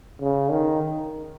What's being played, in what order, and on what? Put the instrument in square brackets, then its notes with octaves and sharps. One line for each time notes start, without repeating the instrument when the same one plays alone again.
[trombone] C#3
D#3